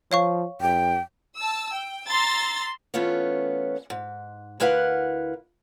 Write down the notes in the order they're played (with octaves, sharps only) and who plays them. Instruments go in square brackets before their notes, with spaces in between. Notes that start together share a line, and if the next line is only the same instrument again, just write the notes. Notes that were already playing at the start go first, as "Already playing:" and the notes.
[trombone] F3 [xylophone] C#5 F5 C#6
[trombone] F2 [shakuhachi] G5
[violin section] A5 E6
G5
A#5 C6 E6 A6
[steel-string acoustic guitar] E3 A3 B3 C#4 F4 C#5
G#2
D2 E4 A#4 B4 F5 F#5